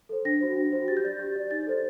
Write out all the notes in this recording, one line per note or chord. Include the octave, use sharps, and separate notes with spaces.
A4 C5
D4 A#6
F#4 C5
D4
F#4 C5
G4 A6
G6
D5 A6
G4
D5
D#4 A6
A4 C5